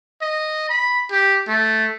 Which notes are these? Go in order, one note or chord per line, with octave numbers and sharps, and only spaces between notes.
D#5
B5
G4
A3